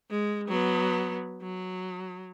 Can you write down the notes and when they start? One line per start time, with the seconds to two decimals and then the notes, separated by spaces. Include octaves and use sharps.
0.10 G#3
0.48 F#3 B3
1.43 F#3